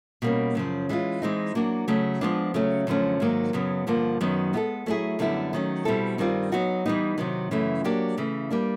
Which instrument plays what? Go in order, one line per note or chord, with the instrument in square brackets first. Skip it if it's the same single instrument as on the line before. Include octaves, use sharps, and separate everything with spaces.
[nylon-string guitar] B2 G3 A#3 C#4
F#2 C#3 F3
E3 G#3 C#4 F4
E3 G#3 C4 D#4
F#3 A#3 D4 F#4
C#3 F#3 A3
F3 G#3 B3 D4 F4
C#3 F#3 A3 C#4
F#2 D3 F3 A3 C#4
G#2 D#3 F#3 A#3
F#2 C#3 F#3 B3
G2 D3 F3 A#3
F#2 D#3 F#3 B3
G#3 B3 E4 A4
F#3 A3 C#4 E4 G#4
F#2 D3 G3 B3 E4
D#3 F#3 A3 C#4
B2 G3 C4 E4 A4
G2 D#3 G3 C4 F4
F#3 B3 D#4 F#4
E3 G3 B3 D#4
C3 D#3 F#3
F#2 C#3 E3 A3
F#3 A#3 D4 G4
C#3 E3 A3
G3 A#3 D4